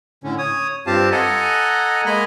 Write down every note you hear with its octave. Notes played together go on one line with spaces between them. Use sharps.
A2 D3 C#4
C#5 D#6
G2 C4 F4 G4 F5 A5
A4 D#5 F#5 G#5 A#5
G#3 A#3 D#5 G#5 A#5 B5